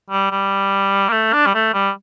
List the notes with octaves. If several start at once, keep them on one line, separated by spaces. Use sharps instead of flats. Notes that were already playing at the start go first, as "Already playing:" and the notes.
G3
G3
A#3
A3
D4
G3
A3
G3